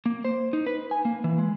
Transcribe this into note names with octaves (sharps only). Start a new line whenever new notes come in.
A#3
C5
D#4
B4
G#5
A#3
E3
G#3